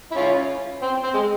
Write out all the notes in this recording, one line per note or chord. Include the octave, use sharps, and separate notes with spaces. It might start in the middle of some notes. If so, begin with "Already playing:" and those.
E4
C#4 F4
C4
C4
G#3